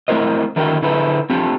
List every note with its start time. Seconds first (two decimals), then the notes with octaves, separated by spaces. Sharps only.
0.08 A3 C4 E4 A#4 C5 D#5
0.56 D3 D#3 E4 F#4 A#4 G5
0.82 D3 D#4 E4 G#4 A4 B4
1.30 C4 D4 F4 G4 A4